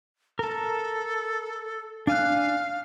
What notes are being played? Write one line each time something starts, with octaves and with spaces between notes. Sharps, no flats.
A4 A#4 A5
D4 F5 G#5 F#6